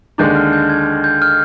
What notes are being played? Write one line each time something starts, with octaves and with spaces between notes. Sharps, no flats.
D#2 D3 G#3 D4 G6
F6
G6
G#6
G6
F6